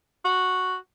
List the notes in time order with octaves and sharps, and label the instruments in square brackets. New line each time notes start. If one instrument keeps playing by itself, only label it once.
[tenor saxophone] F#4